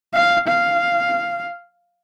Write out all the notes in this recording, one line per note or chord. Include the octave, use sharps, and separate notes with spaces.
F5
F5